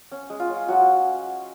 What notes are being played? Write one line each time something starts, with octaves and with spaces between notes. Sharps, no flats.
C#4
G#3
F4
C#4
F#3 F#4